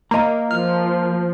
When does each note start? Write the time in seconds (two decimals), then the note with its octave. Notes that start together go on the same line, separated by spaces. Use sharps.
0.11 A#3 D#5 A#5
0.51 F3 F6